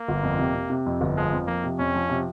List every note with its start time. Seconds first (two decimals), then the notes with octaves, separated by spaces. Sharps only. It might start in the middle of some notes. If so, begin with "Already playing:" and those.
Already playing: A#3
0.08 G1
0.23 F2
0.39 C3
0.55 C3
0.70 C3
0.86 F2
1.01 G1
1.17 F3 G#3
1.33 F2
1.47 F3 A#3
1.64 C3
1.79 F2 C#4
1.95 F3
2.10 C3